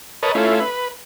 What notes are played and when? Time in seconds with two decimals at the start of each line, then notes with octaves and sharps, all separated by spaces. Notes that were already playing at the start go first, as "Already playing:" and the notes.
0.23 A#4 B4 C#5 D#5 A5
0.35 A3 C#4 E4 F4
0.60 B4